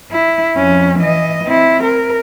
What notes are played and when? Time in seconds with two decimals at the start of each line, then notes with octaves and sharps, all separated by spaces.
0.11 E4
0.57 F2 C#4
0.99 E3 D#5
1.44 C4 E4
1.83 A#4